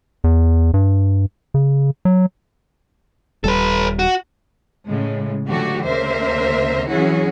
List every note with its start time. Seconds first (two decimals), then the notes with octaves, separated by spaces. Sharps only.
0.24 E2
0.74 G2
1.54 C#3
2.05 F#3
3.44 D#1 G3 A4 B4
3.99 F#4
4.87 A2 C#3 G#3
5.47 D3 F3 F#3 A3 F#4 G4
5.85 D2 C#3 A#3 A#4 C5 E5
6.88 E3 F#3 C#4 E4 F#4 G#4